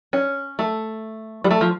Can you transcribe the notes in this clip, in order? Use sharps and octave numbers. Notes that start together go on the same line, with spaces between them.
C#4
A3
G3
A3
F3